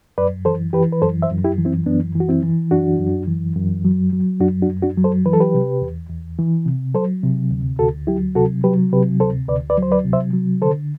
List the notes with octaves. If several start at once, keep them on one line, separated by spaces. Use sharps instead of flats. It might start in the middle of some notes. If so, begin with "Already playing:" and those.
F#2 B4 D5
E3 A4 C5
E3 G4 B4
B4
F#2 A4 C5
C5 E5
F#2
E4 G4
E3
C4 E4
F#2 B3 D4
E3 F#4
C4 E4
E3
F#2 D4 F#4
F#2
E3
F#2
F#3
F#3
F#2 D4 F#4
D4 F#4
F#2
D4 F#4
F#3
A4 C5
E3 B4
A4
G4 B4
C3
E2
E2
E3
C3
F#3 A4 C5
C3
D2
D2 F#4 A4
F#3 E4 G4
C3 F#4 A4
F#3 G4 B4
C3 G4 B4
D2 A4 C5
D2 B4 D5
B4 D5
F#3 C5
B4 D5
C3
C5 E5
F#3
D3 A4 C5